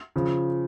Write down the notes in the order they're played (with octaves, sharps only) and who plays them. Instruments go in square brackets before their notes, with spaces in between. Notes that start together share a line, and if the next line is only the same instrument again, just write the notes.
[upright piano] C#3 F3